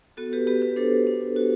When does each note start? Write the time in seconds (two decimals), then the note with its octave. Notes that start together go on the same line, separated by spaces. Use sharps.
0.17 B3 F#4 A4
0.33 G4 B4
0.47 B3 G4 B4
0.62 G4 B4
0.76 D4 A4 C5
1.07 D4
1.36 F#4